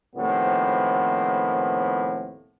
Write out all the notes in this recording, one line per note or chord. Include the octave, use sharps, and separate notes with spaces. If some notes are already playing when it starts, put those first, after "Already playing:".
D#2 A2 C3 F3 B3